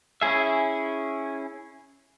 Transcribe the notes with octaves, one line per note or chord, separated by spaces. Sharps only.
C#4 E4 G#4 E5